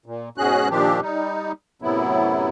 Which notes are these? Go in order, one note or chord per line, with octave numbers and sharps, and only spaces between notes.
A#2
G#2 B2 C#4 F#4 G#4 F#6
A#2 D#3 F3 C4 D4 G4
G3 D#4
F#2 A2 C3 F#3 B3 E4